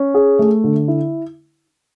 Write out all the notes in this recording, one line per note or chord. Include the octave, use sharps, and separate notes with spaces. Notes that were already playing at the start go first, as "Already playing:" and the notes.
Already playing: C#4
G#4
A3
D3
E4